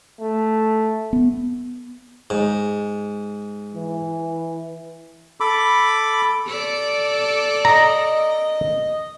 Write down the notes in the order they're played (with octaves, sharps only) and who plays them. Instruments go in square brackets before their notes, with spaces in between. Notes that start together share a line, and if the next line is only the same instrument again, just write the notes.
[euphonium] A3
[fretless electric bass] B3
[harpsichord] G#2
[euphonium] E3
[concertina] A4 B5 D6
[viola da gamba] A4 D5
[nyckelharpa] D#5 [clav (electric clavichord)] A#5